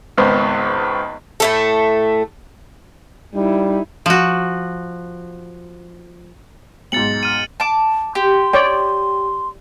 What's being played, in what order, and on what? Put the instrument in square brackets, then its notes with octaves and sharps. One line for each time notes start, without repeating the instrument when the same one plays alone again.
[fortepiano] G#1 C#2 B3 C5
[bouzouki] A2 A3 A4
[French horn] G3 [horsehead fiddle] D#4 E4
[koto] F3 F#4
[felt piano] B1 G#2 [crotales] A6 C#7 F#7
[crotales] F6 D#7
[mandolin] A5 D6
[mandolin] G4 [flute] C6
[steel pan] C#5 D5 G5